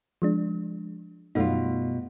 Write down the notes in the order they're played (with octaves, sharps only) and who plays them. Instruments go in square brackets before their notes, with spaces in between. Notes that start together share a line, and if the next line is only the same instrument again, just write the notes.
[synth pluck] F3 G#3 D4
[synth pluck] F#2 A3 D#4 [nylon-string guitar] B2 G3 F4